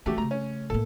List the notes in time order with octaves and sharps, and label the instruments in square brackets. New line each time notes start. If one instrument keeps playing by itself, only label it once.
[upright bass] E3 G3 [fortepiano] A3 F#4 G4
[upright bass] C#3 A3 [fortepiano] A#5
[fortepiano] C#4
[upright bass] A2 A#3 [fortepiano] A4